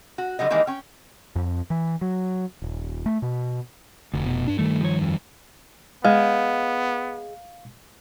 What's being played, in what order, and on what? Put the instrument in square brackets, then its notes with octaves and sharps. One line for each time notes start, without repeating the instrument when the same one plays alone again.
[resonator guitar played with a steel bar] F#4
D3 F#3 G3 D#5
D#3 E3 G3 G#3 A#3 D#4
C#4 G5
[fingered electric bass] F2
E3
F#3
D#1
A3
B2
[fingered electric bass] F1 [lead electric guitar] D2
[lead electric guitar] B2
[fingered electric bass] G2 D4
[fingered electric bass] G2 D#3 G3 [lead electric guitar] A3
[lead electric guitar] F3 C#5
F2
[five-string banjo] G#3 [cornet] B3 [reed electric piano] F5